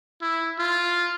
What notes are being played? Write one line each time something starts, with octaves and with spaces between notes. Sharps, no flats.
E4
F4